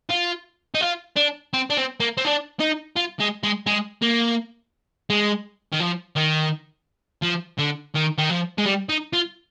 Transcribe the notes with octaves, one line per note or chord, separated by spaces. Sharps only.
F4
D#4
F4
D4
C4
D4
C4
A#3
C4
D4
D#4
F4
G#3
G#3
G#3
A#3
G#3
D#3
F3
D#3
F3
D3
D#3
D#3
F3
G#3
G3
D#4
F4